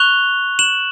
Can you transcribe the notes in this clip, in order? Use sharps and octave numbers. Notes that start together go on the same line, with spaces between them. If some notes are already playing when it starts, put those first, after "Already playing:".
Already playing: C#6 F#6 F7 G7
E7 F#7